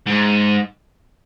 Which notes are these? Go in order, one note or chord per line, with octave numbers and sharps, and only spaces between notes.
G#2